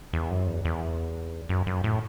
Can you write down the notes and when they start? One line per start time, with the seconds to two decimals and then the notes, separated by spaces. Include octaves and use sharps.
0.13 E2
0.30 F#2
0.48 E2
0.65 E2
1.49 F#2
1.67 F#2
1.84 A2